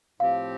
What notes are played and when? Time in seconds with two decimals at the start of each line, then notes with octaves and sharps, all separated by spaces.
0.20 A2 F3 C4 G4 F5